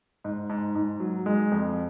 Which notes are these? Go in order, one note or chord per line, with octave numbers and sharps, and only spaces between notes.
G#2
G#2
G#2
F#3
G#3
F2